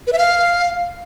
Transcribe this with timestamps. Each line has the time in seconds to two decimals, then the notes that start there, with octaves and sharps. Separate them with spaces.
0.07 B4
0.13 E5
0.18 F5